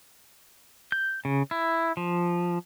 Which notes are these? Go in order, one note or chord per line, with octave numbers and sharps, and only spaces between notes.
G6
C#3
E4
F3